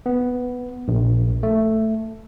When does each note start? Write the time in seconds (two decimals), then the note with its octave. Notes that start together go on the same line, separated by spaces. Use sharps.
0.06 B3
0.88 A#1
1.43 A3